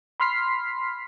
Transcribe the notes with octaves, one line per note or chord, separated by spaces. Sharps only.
B5 C6 F6 B6 C7